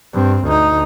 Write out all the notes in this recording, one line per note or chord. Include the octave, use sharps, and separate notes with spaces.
G2 C4
D2 D#4